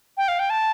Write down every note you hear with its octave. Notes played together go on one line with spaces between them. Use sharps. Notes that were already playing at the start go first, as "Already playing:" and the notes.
G5
F5
G5
A5